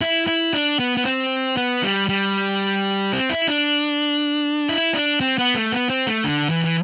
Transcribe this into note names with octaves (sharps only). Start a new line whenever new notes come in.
E4
E4
D4
B3
B3
C4
B3
G3
G3
C4
E4
D4
E4
D4
C4
B3
A3
B3
C4
A3
D3
E3
E3